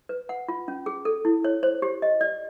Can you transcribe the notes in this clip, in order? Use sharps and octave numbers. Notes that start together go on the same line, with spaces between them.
B4
F#5
F4
C#4
G#4
A4
E4
C#5
C5
G4
D#5
D5